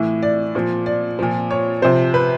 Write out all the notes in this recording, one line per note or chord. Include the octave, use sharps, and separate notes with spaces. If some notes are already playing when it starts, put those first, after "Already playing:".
Already playing: A2 E3
D5
A#2 F3
D5
A#2 F3
C#5
C3 F3 C5
B4